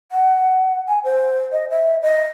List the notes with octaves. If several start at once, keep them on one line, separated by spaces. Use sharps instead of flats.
F#5
G#5
C5
D#5
E5
D#5